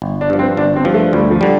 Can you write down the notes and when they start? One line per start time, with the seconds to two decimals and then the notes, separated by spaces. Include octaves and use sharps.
0.02 G1
0.21 D4
0.30 G2 F3
0.39 C4
0.57 G1 D4
0.76 C4
0.85 G2 F3
0.94 A3
1.13 D2 G3
1.31 F3
1.41 D3 G3